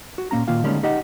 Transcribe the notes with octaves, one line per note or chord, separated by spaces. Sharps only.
F#4
A#2 A#3 C#4 A#5
A#2 D#3 A#3 F4 F5
D3 D#3 G3 G#3 A#3 C#4
D#4 G4 D#5 F#5